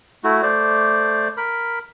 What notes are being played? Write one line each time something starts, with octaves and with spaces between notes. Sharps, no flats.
A3 E4 F#4
A3 C5 D5
A#4 B5